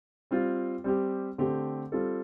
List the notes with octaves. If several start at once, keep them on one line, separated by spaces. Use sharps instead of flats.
G3 C4 F4
G3 C4 G4
D3 A3 C4 G4
G3 C4 F4 A4